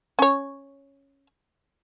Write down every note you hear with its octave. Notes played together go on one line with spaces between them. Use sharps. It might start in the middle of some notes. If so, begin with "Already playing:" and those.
C#4 C#5